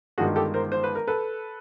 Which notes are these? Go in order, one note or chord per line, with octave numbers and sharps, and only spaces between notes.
G1 G2 D#3 G#3 F#4 G#4
G4 A4
A#4 C5
C5
B4
A#4
A4 B4